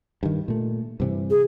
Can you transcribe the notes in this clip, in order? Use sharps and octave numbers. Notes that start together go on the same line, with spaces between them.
G2 D#3
A#2 A3
G2 C3 E3
G#4